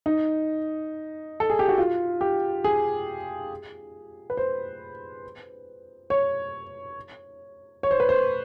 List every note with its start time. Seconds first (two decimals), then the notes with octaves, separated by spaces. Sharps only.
0.06 D#4
1.40 A4
1.50 G#4
1.59 G4
1.68 F#4
1.78 F4
2.21 G4
2.64 G#4
4.30 B4
4.37 C5
6.10 C#5
7.83 C#5
7.91 C5
8.00 B4
8.09 C5